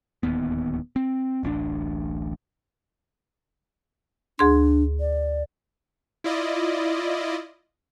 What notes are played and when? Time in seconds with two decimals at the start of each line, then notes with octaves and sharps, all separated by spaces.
0.23 D1 D#2 B3
0.96 C4
1.43 D1 A1 C#4 D4
4.39 D2 D4 G#4 C6
5.00 D5
6.24 E4 F4 D5 D#5